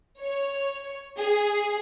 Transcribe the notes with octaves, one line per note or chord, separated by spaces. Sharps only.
C#5
G#4